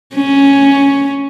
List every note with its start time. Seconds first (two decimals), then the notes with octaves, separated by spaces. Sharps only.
0.15 C#4